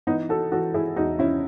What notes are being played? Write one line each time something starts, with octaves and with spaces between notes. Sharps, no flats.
E3 B3 D#4
F#4 A4
E3 F#4 A4
E4 G#4
E2 D#4 F#4
C#4 E4